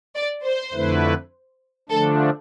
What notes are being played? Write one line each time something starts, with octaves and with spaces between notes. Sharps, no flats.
D5
C5
F2 D3 A3 E4 B4
D3 F3 A3 D4 A4